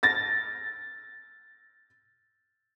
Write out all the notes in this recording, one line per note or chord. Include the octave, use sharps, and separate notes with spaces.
A6 A#6